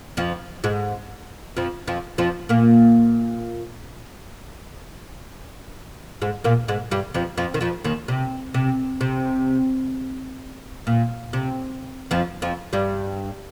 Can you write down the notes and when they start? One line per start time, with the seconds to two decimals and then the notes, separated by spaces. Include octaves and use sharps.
0.17 F2 F3
0.64 G#2 G#3
1.57 F2 F3
1.87 F2 F3
2.18 F2 F3
2.49 A#2 A#3
6.22 G#2 G#3
6.44 A#2 A#3
6.68 G#2 G#3
6.91 G2 G3
7.14 F2 F3
7.37 F2 F3
7.54 D#3
7.61 F2 F3
7.84 D#2 D#3
8.08 C3
8.54 C3
9.01 C3
10.87 A#2
11.33 C3
12.11 F2 F3
12.42 F2 F3
12.73 G2 G3